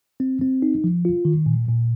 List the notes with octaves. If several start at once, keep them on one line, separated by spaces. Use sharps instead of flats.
C4
C4
D#4
F3
F4
D#3
A#2
A#2